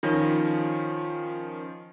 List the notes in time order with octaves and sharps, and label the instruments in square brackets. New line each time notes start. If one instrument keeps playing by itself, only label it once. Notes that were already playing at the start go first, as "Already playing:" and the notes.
[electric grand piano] D#3 F3 C#4 [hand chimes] F4